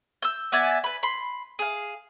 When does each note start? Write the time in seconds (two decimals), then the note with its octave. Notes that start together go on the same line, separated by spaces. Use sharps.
0.22 E6 G6
0.52 B3 D5 E5 G#5
0.84 B4 B5
1.03 B5 C6
1.59 G#4 F5